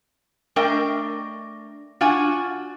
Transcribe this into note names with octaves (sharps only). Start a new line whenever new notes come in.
A3 D4 A#4 D#5 G5
D4 F4 F#4 G#5